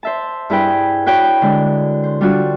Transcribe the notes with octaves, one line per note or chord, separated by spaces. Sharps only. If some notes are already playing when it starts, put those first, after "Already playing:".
C5 E5 A5
G2 E4 G#4 B4 G5
F#4 B4 C#5 G5
D3 G#3
C5
G3 D4 F4 F#4